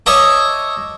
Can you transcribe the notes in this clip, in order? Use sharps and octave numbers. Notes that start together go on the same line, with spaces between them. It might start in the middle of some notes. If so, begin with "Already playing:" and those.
C#5 D#5 E5 A5 D6